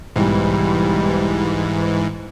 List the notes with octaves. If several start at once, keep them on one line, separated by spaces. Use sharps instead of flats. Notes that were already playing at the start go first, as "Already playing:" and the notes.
B1 G#2 E3 G3